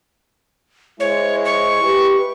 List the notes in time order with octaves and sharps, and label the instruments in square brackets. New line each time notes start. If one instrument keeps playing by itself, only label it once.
[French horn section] G#3 E4 C5 [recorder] C#5
[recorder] C#6
[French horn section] G4 B4